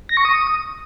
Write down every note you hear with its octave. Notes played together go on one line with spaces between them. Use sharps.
A#6
C#6
D#6